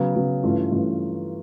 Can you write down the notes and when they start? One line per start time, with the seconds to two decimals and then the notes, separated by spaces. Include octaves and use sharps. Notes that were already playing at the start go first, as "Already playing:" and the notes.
Already playing: C#3 F#3 B3
0.15 C#3 F#3 B3
0.44 G2 E3 A3 C#4 F4
0.71 G2 E3 A3 C#4 F4